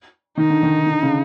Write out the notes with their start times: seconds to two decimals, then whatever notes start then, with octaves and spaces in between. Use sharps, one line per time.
0.38 D#3 D#4
0.50 D3
0.63 D#3
0.86 D3
1.02 C#3